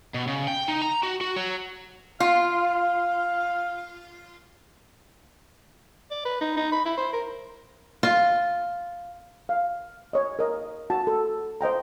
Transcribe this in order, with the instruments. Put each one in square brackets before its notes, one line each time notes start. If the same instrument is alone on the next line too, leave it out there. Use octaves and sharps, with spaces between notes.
[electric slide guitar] B2
C#3
G5
D#4
A#5
F#4
F#4
F#3
[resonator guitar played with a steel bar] F4 [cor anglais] F5
[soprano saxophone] D5
B4
D#4
D#4
B5
E4
C5
A#4
[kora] F4
[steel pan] F5
C#5 D#5
A#4 D#5
F#4 A5
A4
C5 D#5 G5 A#5